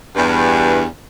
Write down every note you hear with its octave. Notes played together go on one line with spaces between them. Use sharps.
E2 G2